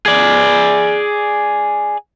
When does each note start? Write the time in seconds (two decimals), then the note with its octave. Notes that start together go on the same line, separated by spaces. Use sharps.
0.06 G#4 D5